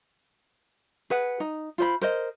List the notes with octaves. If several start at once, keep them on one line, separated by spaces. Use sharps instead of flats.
G#4 B4 F#5
D#4
F4 C5 B5
A#4 C5 D#5